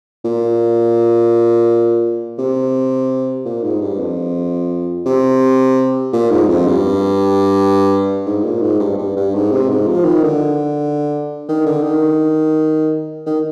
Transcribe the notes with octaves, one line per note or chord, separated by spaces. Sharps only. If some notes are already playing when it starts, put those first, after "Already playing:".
A#2
C3
A#2
G#2
G2
F2
C3
A#2
G#2
F2
G2
G#2
A#2
G#2
G2
G2
G2
G#2
C3
G#2
F3
D#3
D3
D#3
D3
D#3
D#3